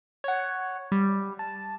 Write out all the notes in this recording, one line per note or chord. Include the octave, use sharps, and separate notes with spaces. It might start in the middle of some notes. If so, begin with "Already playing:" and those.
C#5 F#5
G3
A5